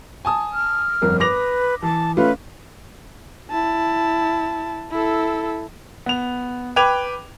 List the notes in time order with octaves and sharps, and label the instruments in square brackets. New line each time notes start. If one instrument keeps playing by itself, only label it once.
[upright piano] G#5 A5 D#6
[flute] F6
[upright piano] G1 F2 A#4
[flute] B4 [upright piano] D6 A#6 F7
[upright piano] E3 [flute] A5
[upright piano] A3 C#4 F4 [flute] B4
[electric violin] E4 A5
E4 A4
[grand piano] B3 F7
B4 G5 D6 G#6 F7